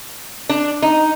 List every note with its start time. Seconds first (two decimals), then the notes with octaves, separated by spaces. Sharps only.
0.49 D4
0.82 D#4